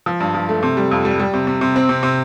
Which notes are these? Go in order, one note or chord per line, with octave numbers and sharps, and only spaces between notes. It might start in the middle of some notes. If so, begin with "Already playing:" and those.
F3
G2
F3
A3
C3
G3
F2
G3
G3
C3
C3
C3
C4
C3
C3